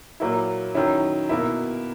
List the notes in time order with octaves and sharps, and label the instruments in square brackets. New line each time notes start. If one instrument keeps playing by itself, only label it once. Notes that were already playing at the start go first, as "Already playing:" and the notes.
[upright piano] A#2 F#3 A#3 E4
D#3 F#3 C#4 E4
B2 A#3 E4